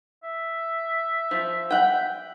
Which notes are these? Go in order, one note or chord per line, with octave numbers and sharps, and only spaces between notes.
E5
F3
F#5 G5